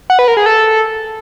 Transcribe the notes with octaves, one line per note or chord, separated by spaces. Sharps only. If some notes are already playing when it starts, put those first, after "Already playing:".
F#5
B4
A#4
G#4
A4